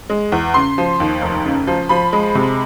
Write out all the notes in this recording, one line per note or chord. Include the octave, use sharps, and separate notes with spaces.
G#3
E2
C#3 C6
F3
D#2
F1
C#3
F3
F3 B5
G#3
C3